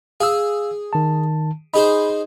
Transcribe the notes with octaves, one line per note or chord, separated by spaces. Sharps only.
G#4 F5 E6
D#3 A5
D#4 G#4 C5 B5